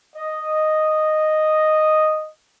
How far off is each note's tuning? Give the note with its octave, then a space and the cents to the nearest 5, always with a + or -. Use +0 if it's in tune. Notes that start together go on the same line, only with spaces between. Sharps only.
D#5 -5